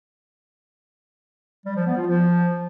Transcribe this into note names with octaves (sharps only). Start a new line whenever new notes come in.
G3
F3
B3
F4
F3